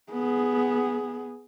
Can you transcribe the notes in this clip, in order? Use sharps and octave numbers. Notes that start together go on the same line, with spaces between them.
B3 G#4